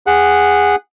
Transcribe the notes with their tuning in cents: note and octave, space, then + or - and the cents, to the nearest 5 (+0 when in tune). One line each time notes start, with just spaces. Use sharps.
G#4 -15 F#5 +0